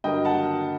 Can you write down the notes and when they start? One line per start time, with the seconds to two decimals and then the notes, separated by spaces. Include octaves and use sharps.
0.04 G2 D3 F#3 A#3 D#5 G5
0.25 F#5 A5